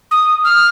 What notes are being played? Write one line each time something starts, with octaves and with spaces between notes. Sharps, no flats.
D#6
F6